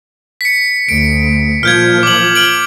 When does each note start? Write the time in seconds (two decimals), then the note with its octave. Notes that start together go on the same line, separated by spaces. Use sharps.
0.41 B6 C#7
0.89 D2 D7
1.63 A#2 F3 F6 G6 G#6
2.03 D6 F#7
2.35 F6 D7 F#7